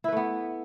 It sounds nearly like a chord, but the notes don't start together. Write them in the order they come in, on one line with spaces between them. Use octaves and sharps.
E4 B4 A3 B3